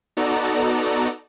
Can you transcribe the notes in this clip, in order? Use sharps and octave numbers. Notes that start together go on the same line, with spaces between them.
B3 D#4 F#4 A4 D5 A#5